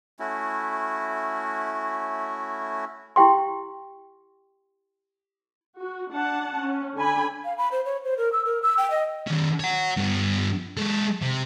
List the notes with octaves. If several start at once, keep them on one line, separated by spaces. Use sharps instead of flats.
A3 C#4 E4 F#4
E4 G4 G5 C6
F#4
D4 F#5 A5
C#4
D3 G#5 B5
F5
B5
C5
C#5
C5
A#4
E6
A#4
E6
G5
D#5
D#3 C#4
C#5 F#5
G2 B3
G#3 A4
C3